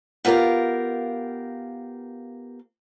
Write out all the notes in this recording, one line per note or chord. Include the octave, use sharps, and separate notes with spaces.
B3 F4 G4 A#4 F5